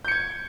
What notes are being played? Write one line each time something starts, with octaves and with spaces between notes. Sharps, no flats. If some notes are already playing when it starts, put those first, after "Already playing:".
G6 G#6 C#7